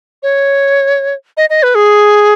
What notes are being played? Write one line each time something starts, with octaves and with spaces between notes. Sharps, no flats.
C#5
D#5
D#5
B4
G#4